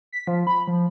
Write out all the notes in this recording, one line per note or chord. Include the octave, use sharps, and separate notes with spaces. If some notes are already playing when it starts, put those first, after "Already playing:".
B6
F3
B5
F3